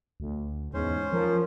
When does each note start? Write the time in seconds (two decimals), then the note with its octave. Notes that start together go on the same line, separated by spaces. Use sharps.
0.20 D2
0.74 E2 G#2 C#4 C5
1.13 F3 A#4